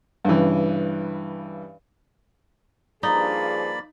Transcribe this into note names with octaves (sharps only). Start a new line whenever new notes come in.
G2 C#3 E3
G2 F3 A#3 D#4 G#4 D5 B5